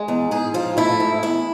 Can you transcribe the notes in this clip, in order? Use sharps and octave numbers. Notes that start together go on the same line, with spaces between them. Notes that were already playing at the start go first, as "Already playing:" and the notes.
Already playing: G#3
E2
G#2 G#4
F3 F4
A3 E4
G#2
E2 E4